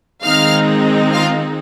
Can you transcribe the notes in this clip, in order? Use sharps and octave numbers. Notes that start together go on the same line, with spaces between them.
D#3 G#3 C4 D#4 F5 F6
F4 F5